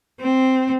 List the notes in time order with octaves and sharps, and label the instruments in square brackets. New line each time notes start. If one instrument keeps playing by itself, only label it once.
[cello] C4